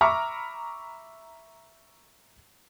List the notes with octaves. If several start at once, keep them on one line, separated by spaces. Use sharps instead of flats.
E5 A#5 B5 C#6 D6 F6